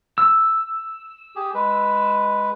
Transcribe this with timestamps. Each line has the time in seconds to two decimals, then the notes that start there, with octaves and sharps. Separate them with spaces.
0.18 E6
1.36 G4 G#4
1.54 G#3 B4